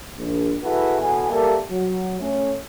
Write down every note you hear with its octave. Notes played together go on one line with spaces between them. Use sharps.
A#1
E4 F#4 G#4 A4 B4 E5
E2 B2 A4 G#5
G3 A#3 G4 A4 A#4 E5
F#3
A3 C#4